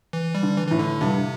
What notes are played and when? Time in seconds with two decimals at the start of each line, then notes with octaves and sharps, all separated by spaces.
0.13 E3
0.35 G3
0.43 D3
0.57 E3
0.68 A2 E3
0.79 D3
1.01 G2 C3